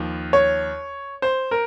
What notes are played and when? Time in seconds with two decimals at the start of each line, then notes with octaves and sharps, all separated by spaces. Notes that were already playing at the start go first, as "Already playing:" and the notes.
Already playing: D#2 F3
0.33 C#5
1.22 C5
1.51 A#4